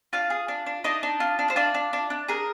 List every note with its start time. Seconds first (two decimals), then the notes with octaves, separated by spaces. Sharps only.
0.13 D4 F4 F5
0.30 G#4
0.48 D4
0.66 D4
0.84 D4 D#4 D#5
1.03 D4
1.20 F4
1.39 D4
1.50 C5
1.56 D4 F4 D5
1.74 D4
1.93 D4
2.10 D4
2.28 G#4 A#4